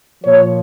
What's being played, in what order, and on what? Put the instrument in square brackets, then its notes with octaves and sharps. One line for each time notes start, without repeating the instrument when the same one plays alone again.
[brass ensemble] A#2 F3 C#5